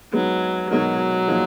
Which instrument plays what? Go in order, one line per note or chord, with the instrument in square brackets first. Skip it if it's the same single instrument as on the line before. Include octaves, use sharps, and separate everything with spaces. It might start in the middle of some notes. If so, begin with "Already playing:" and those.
[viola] F#3 [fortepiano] G#3 B3 D#4
[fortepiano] B2 G#3 D#4 F#4 A#4 [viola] F#3
[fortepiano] A#2 F3 A#3 D#4 G#4